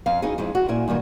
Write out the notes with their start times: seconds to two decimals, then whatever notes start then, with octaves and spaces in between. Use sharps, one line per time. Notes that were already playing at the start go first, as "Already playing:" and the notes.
0.06 F2 F5
0.22 C4 D#4 E4 F#4 G#4
0.38 F2 G#3 C4 E4
0.55 F#4
0.68 A#2 E4 E5 G#5
0.88 G2 A#2 D#3 F#3